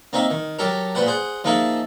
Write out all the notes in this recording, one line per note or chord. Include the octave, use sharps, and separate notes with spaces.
A#3 C4 D#4 E5
D#3
F#3 G4 A4 A#4
A#2 B4 C5 F#5
G#4 C5 F#5
F3 A#3 D#4 G#4 A4 E5